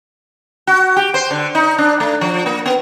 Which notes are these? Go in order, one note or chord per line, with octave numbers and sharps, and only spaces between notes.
F#4
G4
C5
D3
D#4
D4
A3
F3
A#3
B3